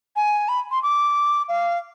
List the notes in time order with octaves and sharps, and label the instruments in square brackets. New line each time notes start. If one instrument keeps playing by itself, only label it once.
[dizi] G#5
B5
C6
D6
F5